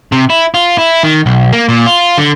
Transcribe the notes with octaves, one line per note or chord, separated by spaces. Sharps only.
C3
E4
F4
E4
D#3
B1
A#3
A#2
F4
D3